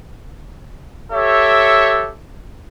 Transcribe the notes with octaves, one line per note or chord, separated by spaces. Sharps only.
G4 A4 C#5 E5